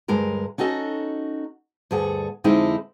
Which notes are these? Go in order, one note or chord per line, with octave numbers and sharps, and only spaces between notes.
D2 G2 G#3 A#4 A#5
C#4 D#4 F#4 A4 D#5
D2 G2 G#4 A4 F#5
F2 D3 G#3 C4 D#4 E4